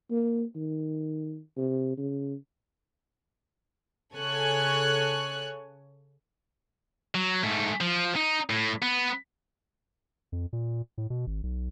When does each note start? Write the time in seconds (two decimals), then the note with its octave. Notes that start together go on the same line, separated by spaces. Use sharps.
0.11 A#3
0.56 D#3
1.57 C3
1.98 C#3
4.14 C#3 A4 C#5 G#5 C#6 F#6
7.15 F#3
7.44 G#2 A3
7.81 F3
8.16 D#4
8.50 A2
8.82 B3
10.32 F2
10.53 A#2
10.98 A2
11.10 B2
11.27 G#1
11.43 B1